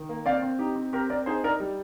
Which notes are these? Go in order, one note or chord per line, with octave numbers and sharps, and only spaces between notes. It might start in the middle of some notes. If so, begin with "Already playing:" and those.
Already playing: D#3
A#3
C4 D5 F5
C4
D#4 G4
C4
C4 G4 A#4
C4 A#4 D5
D#4 G#4 C5
D#4 A#4 D5
G3